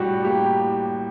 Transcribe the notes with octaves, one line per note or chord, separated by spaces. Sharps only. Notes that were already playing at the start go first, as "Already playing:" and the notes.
Already playing: A2 G3 D4 F#4 G4
A#3 G4